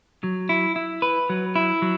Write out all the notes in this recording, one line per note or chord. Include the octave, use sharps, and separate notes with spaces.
F#3
E4
E4
B4
F#3
E4
F#3